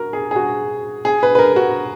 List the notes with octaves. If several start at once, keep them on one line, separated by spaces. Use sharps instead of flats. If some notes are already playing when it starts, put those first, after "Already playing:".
Already playing: F#4 A#4
G#4
G#4
F#4
G#4
B4
B4
A#4
F#4